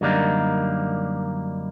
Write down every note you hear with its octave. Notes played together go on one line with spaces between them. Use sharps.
F#2 D3 G3 A#3 D#4